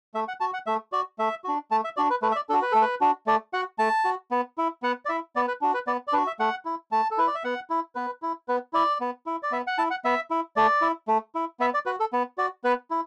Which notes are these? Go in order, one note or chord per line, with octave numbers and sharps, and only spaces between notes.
A3 E5
F#5
F#4 A5
F#5
A3 E5
F#4 D5
A3 E5
D4 F#4
A3 A5
E5
D4 F#4 D5
B4
A3 B4
E5
D5
D4 F#4 A4
B4
A3 A4
B4
D4 F#4
A3 D5
F#4 F#5
A3 A5
F#4
B3
E4
B3 F#5
D5
E4 E5
B3 D5
B4
D4 F#4
B4
B3 D5
D5
D4 F#4 B4
E5
A3 F#5
E4
A3 A5
A4
E4 B4
D5
E5
B3 F#5
E4
B3 B4
E4
B3 B4
E4 D5
B3
E4
D5
B3 E5
F#5
E4 A5
F#5
B3 E5
E4
A3 D5
E4
A3
E4
B3 E5
D5
F#4 B4
A4
B3
F#4 D5
B3 B4
E4